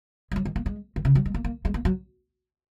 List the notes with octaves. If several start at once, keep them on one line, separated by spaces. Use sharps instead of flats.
G#3
F#3
D#3
A#3
G#3
D#3
C#3
F#3
G#3
A#3
A#3
G#3
A#3
F#3